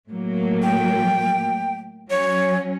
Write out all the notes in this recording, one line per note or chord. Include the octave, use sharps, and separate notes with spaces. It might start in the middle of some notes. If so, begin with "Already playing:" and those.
A2 F#3 A#3
G5
F#3 C#4 C#5